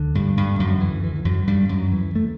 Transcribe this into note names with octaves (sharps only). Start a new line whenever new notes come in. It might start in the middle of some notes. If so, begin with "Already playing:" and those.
Already playing: D2 D3
G2 G3
G2 G3
F#2 F#3
E3
E3
E3
F#2 F#3
G2 G3
F#2 F#3
E3
A3